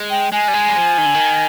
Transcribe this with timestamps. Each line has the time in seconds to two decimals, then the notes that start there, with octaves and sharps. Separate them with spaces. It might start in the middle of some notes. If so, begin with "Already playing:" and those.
Already playing: G#3
0.10 G5
0.32 G#3 G#5
0.48 G3
0.54 G#3
0.69 G3
0.76 F3
0.98 D#3
1.06 D3
1.14 D#3